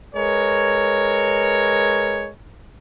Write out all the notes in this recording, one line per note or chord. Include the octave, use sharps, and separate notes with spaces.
G#3 A#4 B4 C#5